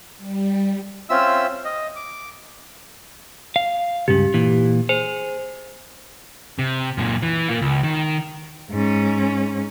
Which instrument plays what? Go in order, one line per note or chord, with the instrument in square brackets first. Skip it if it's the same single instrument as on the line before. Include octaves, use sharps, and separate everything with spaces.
[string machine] G3
[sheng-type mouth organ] C4 C#4 F4 E5 E6
D#5
D6
[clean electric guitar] F5
[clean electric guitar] C#2 G2 C#3 [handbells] G4
[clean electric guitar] A#2 E3
[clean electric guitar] G#4 [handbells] C5
[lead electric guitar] C3
F#2 A#2
E3
A#3 F4
C#2
D#3
[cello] G#2 C#4